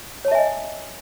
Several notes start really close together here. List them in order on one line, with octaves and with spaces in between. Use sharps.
C#5 A5 E5 G#5 D#5